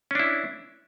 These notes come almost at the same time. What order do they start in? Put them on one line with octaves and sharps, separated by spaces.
C#4 D4 E4